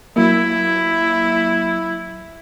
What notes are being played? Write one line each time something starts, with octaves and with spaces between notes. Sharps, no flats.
F#3 A#3 E4